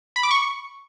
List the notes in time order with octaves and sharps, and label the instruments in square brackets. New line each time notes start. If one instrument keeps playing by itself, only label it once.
[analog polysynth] B5
D6
C#6